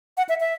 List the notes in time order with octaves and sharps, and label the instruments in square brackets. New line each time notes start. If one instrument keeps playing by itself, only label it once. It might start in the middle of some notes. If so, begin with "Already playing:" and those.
[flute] F#5
E5
E5